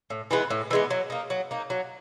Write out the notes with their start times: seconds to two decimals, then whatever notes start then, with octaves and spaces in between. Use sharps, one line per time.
0.10 A2
0.31 E3 G#3 B3
0.50 A2
0.71 E3 G#3 B3
0.90 F#3
1.10 A#3 D#4
1.30 F#3
1.51 A#3 D#4
1.70 F#3